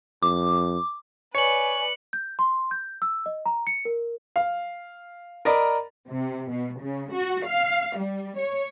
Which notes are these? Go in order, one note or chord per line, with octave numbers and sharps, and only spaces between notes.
F2 D6
B4 C#5 D5 G#5 C#7 F#7
G6
C6
G6
E6
D#5
A#5
C#7
A#4
F5
A#4 D5 D#5 A#5 B5
C3
B2
C#3
F#4
F5
G3
C#5